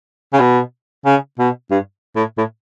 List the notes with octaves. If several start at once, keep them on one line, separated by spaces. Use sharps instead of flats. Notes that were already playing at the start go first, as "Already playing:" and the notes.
C#3
B2
C#3
B2
G2
A2
A2